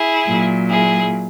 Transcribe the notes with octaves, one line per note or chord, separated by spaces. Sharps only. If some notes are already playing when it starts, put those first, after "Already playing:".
Already playing: E4 G#4
A#2 F#3
E4 G#4